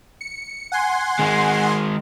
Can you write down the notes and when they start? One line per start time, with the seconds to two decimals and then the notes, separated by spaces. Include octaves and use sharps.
0.21 C#7
0.72 F#5 G#5 C6
1.19 D#3 G#3